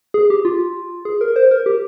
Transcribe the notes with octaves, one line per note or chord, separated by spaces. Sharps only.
G#4
G4
F4
G#4
A#4
C5
A#4
G4